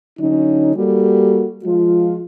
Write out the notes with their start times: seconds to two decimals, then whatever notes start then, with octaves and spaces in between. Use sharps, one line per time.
0.19 D3 F#3 C#4 D#4
0.76 G3 A#3 F#4 G4 A4
1.65 F3 G#3 F4